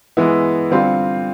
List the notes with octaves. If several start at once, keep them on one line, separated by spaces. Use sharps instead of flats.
E3 G#3 B3 E4
D3 G3 C4 F4